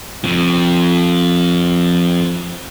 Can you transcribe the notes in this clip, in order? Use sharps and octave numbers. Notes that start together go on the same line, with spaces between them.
F2 F3